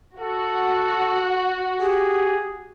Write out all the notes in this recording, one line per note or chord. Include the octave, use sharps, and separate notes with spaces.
F#4 A4
G4 G#4